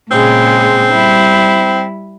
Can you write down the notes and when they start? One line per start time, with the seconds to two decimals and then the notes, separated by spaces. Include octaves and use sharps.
0.11 A#2 C#3 G#3 C4
0.92 G3 E4